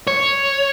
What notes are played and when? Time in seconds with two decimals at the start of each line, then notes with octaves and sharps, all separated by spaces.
0.07 C#5